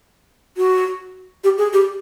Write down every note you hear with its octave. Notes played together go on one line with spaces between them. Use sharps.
F#4
G4
G#4
G4